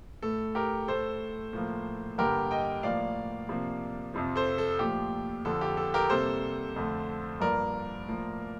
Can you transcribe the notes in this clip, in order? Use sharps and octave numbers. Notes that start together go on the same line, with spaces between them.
A2 A3 A4
G4 A#4
A2 A3 A4 C5
A2 F3 A#3
G2 D3 G3 A#3 G4 A#4
D#5 G5
A2 F3 A#3 D5 F5
C3 F3 A#3
F2 C3 F3
A4 C5
A4
A#2 F3 A3 G4
F2 D3 F3 A4
G4
A4
G4 A#4
C3 G3 A#3 A4 C5
F2 D3 A3
G2 F3 A#3 A#4 D5
A2 F3 A#3